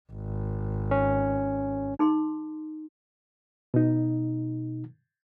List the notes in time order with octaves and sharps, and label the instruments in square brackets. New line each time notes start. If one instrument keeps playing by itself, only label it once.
[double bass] G#1
[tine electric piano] C#4
[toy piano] D#4 G#4 C6
[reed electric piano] B2 D#4